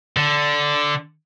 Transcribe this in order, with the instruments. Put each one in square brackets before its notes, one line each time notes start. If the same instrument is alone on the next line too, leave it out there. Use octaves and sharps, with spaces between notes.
[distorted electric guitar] D3